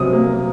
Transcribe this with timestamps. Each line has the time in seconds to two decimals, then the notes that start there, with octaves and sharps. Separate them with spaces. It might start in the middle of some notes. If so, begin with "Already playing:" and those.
Already playing: C3 F#3 D#6
0.13 A#3